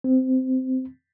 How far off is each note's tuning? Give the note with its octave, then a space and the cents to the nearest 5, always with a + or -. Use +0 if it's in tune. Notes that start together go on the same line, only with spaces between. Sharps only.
C4 -15